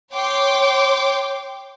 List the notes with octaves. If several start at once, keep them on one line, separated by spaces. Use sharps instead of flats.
C#5 G5 C6 D6